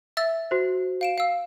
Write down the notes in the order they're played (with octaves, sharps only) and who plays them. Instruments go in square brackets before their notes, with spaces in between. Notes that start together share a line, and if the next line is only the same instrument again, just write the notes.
[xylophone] E5 E6 A6
[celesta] F#4 C5
[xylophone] F5 D7 E7
F5 E6